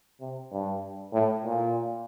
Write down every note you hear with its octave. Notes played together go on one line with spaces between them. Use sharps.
C3
G2
A2
A#2